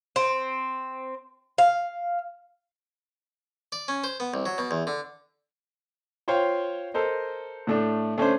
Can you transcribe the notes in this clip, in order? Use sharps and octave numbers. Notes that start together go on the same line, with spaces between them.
C4
F5
D5
C#4
C5
B3
C2
F#3
B2
E2
D3
F4 C5 C#5 F5 G5
A4 A#4 C5 D#5
A2 A3 D4
A3 C#4 D4 C5